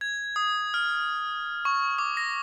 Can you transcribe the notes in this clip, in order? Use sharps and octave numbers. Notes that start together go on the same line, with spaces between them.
G#6
D#6
F6
C#6
D6
A#6